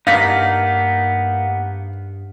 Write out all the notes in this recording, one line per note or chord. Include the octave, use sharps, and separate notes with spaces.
G2 A#3 B3 D#4 F5 B6